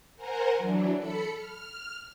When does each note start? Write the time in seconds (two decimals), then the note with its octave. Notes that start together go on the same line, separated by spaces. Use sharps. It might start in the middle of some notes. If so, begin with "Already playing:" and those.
0.16 A#4 C5 F#5 G#5 A#5
0.55 E3 F#3 D4
0.97 A4 B5 C#7
1.33 F6